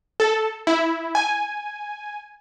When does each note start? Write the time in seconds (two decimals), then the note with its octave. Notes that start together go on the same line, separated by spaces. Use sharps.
0.20 A4
0.67 E4
1.15 G#5